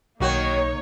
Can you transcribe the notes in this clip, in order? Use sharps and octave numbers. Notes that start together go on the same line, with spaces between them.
B1 D#3 A#3 D#4 F#4 C#5